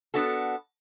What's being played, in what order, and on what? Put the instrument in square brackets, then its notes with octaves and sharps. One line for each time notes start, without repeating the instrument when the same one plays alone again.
[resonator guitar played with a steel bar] B3 D4 F#4 A4